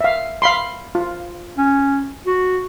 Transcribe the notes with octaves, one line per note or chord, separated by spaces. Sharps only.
E5 F5
F5 B5 C6
F4
C#4
F#4